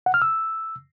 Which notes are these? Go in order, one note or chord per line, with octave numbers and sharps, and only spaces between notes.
F#5
F6
E6